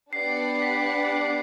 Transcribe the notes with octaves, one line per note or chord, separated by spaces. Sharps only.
B3 D4 G4 D5 F#5 C7
C7
C7
B6
B6
C7